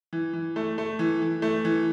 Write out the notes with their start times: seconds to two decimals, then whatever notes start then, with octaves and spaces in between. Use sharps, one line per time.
0.13 E3
0.33 E3
0.56 A3
0.78 A3
0.99 E3
1.22 E3
1.42 A3
1.65 E3